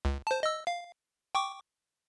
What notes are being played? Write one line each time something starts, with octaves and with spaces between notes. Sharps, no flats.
C#2
C5 A5
D#5 E6
F5
G5 C#6 D6